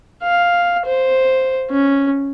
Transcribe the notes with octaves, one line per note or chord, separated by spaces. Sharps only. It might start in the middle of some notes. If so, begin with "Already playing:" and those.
F5
C5
C#4